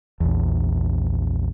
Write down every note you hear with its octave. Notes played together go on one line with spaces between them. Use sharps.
A#1 E2